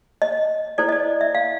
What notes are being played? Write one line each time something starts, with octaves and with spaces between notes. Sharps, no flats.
D#5
E4 A4 C5 D5
D#5
D5
E5
F5